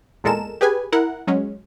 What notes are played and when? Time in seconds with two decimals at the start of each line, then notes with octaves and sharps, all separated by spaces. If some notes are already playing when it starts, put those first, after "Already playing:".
0.24 E2 A#2 G#3 A4 A#4 E7
0.61 G4 G#4 B4 G#5
0.92 E4 A#4 F#5
1.27 F#3 G#3 C#4